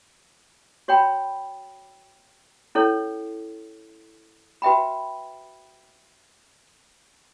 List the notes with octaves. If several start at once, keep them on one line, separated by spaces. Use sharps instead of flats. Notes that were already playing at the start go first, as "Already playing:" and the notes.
F#4 C#5 G5 B5
C#4 E4 A4 C#5
F#4 B4 E5 G5 B5